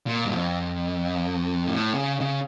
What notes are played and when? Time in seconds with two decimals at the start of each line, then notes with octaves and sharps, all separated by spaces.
0.07 A#2
0.25 G2
0.34 F2
1.68 A2
1.94 C#3
2.21 C#3